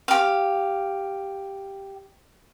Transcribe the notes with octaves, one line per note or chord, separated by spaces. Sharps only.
G4 F5